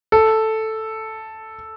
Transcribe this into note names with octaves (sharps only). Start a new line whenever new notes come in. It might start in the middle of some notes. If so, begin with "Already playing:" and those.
A4